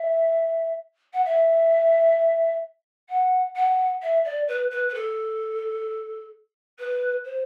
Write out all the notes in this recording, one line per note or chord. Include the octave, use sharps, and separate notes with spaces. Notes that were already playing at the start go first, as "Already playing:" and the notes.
Already playing: E5
F#5
E5
F#5
F#5
E5
D5
B4
B4
B4
A4
B4
C5